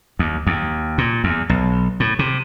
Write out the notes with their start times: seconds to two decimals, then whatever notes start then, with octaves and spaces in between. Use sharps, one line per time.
0.19 D#2
0.47 D#2
0.98 A#2
1.24 E2
1.49 B1
2.00 A2
2.19 C3